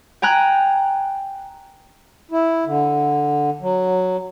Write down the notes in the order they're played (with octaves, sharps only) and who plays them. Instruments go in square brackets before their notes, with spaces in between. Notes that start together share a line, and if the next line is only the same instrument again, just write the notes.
[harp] G5 G#5 A#5 F#6
[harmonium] E4
D3
F#3